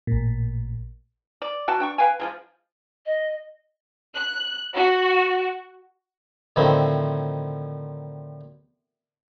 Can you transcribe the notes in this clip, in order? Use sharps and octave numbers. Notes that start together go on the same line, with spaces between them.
A1 A#2
D5
B2 F#4 G5 A5
D4 G5 C#6
B4 F5 G5 G#5
F3 F#3 G#3
D#5
F#6
F#4
A2 D3 D#3 F3 C4 E4